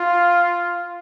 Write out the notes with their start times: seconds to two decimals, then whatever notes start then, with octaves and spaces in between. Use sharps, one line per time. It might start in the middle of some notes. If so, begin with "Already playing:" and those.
Already playing: F4